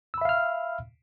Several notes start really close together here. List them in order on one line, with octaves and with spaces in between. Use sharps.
E6 B5 E5 F5 F6